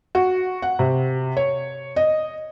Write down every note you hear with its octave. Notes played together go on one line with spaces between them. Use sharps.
F#4
F#5
C3
C#5
D#5